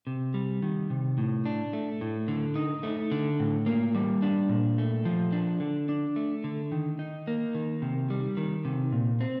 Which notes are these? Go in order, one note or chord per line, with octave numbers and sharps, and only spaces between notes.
C3
G3
D#3
C3
A2
D4
A3
A2
D3
D#4
A3
D3
A2
A#3
G3
D4
A#2
A3
F3
D4
D3
D4
A3
D3
D#3
D#4
A#3
D#3
C3
G3
D#3
C3
A#2
C4